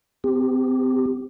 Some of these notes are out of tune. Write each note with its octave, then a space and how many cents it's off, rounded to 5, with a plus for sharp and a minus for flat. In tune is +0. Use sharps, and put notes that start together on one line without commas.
C4 -35 G4 +20